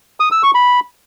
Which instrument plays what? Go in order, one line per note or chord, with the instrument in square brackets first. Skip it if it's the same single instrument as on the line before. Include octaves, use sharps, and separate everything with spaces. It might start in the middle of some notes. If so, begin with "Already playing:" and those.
[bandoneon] D#6
E6
C#6
B5